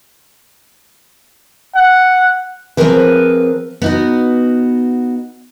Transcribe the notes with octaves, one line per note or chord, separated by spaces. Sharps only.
F#5
F3 A3 C4 G#4 A#4 B4
B3 D#4 F#4